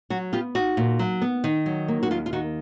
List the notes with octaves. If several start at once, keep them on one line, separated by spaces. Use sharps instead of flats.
F#3 F#4
B3 F4 G4
D#4 F#4
A#2
F#3
B3
D#3
F#3
A#3
F#4
D#2 F4
F4
D#3 F#4